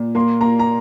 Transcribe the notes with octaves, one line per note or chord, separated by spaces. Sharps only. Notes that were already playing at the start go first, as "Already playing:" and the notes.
Already playing: A#2
A#3 C6
A#3 A#5
A#5